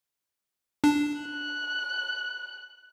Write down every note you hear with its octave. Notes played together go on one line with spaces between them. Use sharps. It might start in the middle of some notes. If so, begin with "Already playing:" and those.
D4
F#6